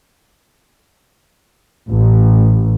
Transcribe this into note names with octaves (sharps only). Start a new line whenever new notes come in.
A1